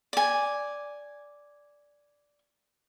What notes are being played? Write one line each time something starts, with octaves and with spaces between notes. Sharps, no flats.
D5 G#5